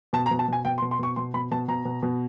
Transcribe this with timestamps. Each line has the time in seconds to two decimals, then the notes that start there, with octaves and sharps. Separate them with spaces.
0.13 B2 A5
0.26 A#5
0.31 B2
0.39 A5
0.48 B2 G#5
0.65 B2 G5
0.78 C6
0.82 B2
0.91 C6
0.99 B2 C#6
1.16 B2 C6
1.34 B2 B5
1.51 B2 A5
1.68 B2 A#5
1.85 B2
2.03 B2